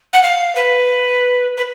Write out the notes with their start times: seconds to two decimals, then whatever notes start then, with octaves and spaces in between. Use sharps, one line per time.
0.13 F#5
0.23 F5
0.55 B4
1.57 B4